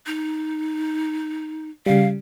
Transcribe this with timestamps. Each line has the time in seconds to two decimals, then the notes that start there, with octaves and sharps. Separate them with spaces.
0.06 D#4
1.86 C#3 G3 F5